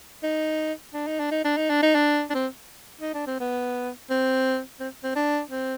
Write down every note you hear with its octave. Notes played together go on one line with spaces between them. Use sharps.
D#4
D4
D#4
D4
D#4
D4
D#4
D4
D#4
D4
D4
C4
D#4
D4
C4
B3
C4
C4
C4
D4
C4